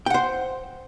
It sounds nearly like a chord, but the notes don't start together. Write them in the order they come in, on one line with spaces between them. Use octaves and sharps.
G5 F#5 C5